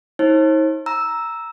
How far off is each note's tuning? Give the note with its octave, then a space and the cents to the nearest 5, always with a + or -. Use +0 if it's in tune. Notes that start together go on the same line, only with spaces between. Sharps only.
D#4 +45 C5 +45
A#5 +0 E6 +0